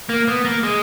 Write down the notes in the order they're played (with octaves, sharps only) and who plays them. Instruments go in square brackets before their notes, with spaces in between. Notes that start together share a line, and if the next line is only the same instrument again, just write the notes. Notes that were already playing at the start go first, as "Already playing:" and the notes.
[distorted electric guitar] A#3
B3
A#3
G#3